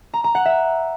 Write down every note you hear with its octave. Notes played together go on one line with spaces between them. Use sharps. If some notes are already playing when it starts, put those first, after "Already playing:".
A#5
A#5
F#5
E5